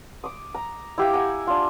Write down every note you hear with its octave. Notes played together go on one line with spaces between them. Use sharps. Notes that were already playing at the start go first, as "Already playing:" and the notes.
D6 D#6
A#5
E4 G4 F5 G5
F#5 G#5 A#5
D4 F4